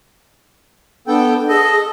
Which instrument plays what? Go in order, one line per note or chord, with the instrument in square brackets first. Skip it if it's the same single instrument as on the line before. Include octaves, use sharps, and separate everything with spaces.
[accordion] B3 A4 G5 [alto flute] D4
[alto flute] G#4 [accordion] A4 D#5